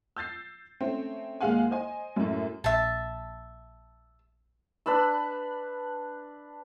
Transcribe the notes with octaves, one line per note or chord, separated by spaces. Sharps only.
E6 G6 A6 C7
A3 C4 C#4 C5
D#2 A#2 G#3 F5 F#5 G#5
C5 D#5 G#5
F#2 A2
A#1 E5 A5
D4 B4 B5 E6